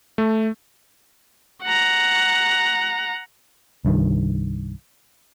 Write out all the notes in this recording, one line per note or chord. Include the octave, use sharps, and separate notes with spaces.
A3
F#5 A#5
C2 G2 D#3